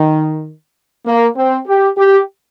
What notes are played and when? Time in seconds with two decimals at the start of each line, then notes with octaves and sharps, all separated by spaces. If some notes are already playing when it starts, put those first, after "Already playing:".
Already playing: D#3
1.06 A#3
1.37 C4
1.68 G4
1.98 G4